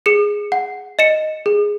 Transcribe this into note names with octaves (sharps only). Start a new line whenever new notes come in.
G#4 C#7 E7
F#5
D#5 C#7 E7
G#4